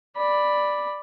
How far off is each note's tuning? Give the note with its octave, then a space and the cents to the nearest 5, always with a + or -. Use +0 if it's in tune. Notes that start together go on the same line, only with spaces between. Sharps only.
D5 +5 B5 +0